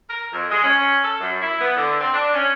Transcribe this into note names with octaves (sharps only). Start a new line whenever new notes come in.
A#4
F2
G#3
C#4
A4
F#2
E4
B3
D3
C4
D4
C#4